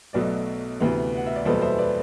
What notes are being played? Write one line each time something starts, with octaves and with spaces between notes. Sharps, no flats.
B1 B2 F#3 A3 B4 D5
D2 C3 E3 B3
F#5
E5
D5
F#1 E2 B2 G3 B3 A4 C5
C5 E5
B4 D5